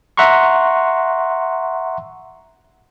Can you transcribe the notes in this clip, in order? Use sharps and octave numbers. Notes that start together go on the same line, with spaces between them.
E5 F#5 A#5 C6 C#6